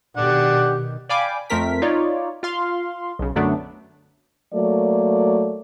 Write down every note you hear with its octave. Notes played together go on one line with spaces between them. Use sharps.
B2 D#3 D4 G4 F#5
D5 F5 G5 G#5 B5 D6
F2 A3 C4 A#4 B6
D#4 F4 C#5 D5
F4 F5 C6
B1 C#3
F#2 D3 F#3 A3 B3 D4
F#3 A3 A#3 D5